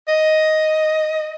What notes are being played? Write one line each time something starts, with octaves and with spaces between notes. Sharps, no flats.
D#5